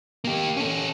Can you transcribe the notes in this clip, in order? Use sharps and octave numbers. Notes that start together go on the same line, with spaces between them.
A#3 G4
C#4 A4